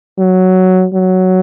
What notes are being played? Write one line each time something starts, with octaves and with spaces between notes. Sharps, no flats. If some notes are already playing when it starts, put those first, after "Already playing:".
F#3
F#3